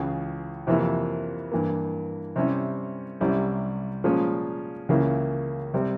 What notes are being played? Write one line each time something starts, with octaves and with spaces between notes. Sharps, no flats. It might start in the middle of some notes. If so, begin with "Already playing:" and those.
Already playing: C#2 C#3 E3
F2 C3 E3 A#3 E4
G2 E3 A#3
C3 G3 C#4 E4
C2 C3 G3 C#4 E4
A#2 F3 G#3 C#4
C#2 C#3 E3 A#3 E4
C3 G3 C4